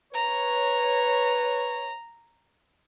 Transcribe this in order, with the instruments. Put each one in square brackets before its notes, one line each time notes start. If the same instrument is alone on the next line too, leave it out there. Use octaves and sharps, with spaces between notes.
[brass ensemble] B4 C#5 [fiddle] A#5